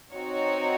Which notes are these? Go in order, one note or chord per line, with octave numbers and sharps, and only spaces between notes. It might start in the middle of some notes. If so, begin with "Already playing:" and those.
C4 D#4 F#4 C#5